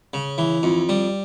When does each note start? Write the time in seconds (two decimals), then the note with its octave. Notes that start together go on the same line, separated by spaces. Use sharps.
0.14 C#3
0.38 E3
0.63 F2
0.89 G3